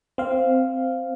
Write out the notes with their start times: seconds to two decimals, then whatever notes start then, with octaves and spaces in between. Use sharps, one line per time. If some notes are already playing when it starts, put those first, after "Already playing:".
0.18 C4 F5